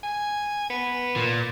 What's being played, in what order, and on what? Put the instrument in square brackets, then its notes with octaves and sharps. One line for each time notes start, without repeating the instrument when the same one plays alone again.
[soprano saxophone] G#5
B3
[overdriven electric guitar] A#2